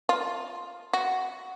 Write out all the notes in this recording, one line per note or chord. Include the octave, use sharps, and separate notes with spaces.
F4
F#4